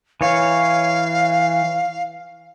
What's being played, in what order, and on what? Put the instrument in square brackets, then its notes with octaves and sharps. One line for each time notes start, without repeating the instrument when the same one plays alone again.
[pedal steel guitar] E3 C#5 [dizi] F5